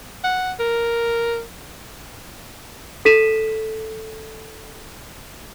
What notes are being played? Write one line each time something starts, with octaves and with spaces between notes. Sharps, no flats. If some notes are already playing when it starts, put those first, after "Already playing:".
F#5
A#4
A4 B6 D#7 E7